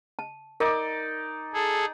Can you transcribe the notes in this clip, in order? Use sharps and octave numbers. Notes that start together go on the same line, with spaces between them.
A5
D#4 A#4 D5
G#4 A4